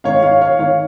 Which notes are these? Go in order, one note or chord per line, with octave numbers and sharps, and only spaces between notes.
G#2 D#3 C#5 F5
C#5 F5
C#5 F5
D#3 C#5 F5